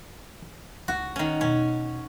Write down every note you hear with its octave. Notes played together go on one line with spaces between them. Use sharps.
E3
C#2 E4 F#4
D#3 C#4
E2 B2 C#4